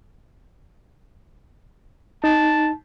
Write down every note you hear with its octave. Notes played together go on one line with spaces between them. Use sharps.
D#4 A5